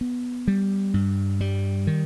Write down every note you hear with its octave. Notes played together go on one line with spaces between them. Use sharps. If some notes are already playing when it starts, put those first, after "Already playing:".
B3
G3
G2
G3
D#3